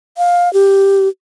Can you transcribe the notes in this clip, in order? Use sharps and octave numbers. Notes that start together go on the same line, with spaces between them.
F5
G4